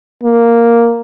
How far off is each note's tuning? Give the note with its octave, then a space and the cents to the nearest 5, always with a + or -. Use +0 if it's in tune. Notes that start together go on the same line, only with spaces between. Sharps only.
A#3 +0